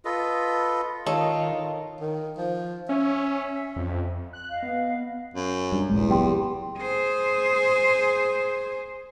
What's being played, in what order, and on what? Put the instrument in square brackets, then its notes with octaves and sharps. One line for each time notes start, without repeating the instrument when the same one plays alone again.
[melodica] F4 A4 B4 D#5
[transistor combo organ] D#3 [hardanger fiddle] F4 A#4 [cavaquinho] A4 [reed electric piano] C#5 D#5
[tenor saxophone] D#3
F3
[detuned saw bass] C#4 [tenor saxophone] E5
[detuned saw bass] F2
[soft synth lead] F#6
[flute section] D#5 F5
[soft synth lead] B3
[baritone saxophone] F#2
[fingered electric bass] G2
[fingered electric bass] D#1 A#1 G#3 [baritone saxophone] E2
[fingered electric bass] C#2 F#3 B3 [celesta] G4 G5 C6
[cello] G#4 C5